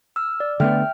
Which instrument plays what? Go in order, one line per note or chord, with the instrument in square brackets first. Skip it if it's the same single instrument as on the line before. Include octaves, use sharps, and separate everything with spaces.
[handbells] E6 F6
D5
[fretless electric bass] D3 A3 B3 [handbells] E5 G5 F6